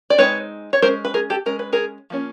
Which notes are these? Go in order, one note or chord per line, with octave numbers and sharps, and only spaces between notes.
D5
G#3 C4 D#4 B4 C#5
C#5
G#3 C#4 A#4 C5
B4
G#4 A#4
G4 A4
G#3 C#4 A#4
B4
G#4 A#4
F3 A#3 C#4